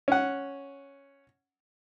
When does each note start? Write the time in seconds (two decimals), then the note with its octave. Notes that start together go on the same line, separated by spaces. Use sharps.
0.08 C#4 F#5